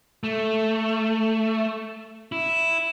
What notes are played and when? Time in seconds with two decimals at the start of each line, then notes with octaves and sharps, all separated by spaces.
0.24 A3
2.32 E4